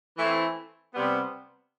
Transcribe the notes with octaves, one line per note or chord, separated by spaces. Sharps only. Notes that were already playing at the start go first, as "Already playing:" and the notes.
E3 A3 C4
C3 G3 B3